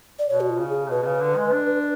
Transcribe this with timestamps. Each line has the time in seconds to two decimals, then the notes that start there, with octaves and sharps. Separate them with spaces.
0.19 D5
0.29 B2 C#5
0.40 F#4
0.50 F4
0.60 C#3
0.70 G#4
0.90 B2 B4
1.02 B2
1.06 C#3
1.21 D3
1.37 G#3
1.53 D4